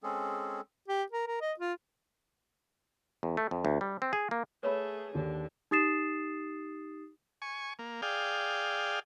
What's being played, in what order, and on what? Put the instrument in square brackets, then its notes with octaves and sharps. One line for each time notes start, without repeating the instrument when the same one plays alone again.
[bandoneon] G#3 C4 C#4 G#4 A4
[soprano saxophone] G4
A#4
A#4
D#5
F4
[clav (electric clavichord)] E2
A3
F2
D2
G3
C4
G#4
A#3
[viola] A3 G#4 [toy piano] B4 C#5 B5
[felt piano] D#2 [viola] D3
[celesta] D#4 G4 D#6 A6 C7 E7
[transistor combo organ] G#5 C#6
A#3
G#4 D5 F5 G5